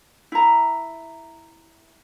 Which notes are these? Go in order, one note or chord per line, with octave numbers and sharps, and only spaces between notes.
E4 A#5